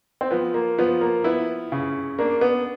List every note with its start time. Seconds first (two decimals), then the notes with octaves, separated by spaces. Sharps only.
0.21 C4
0.31 F3 B3
0.54 A#3
0.78 F3 B3
1.01 A#3
1.24 B3 E4
1.72 C#3
2.19 A#3 D4
2.41 B3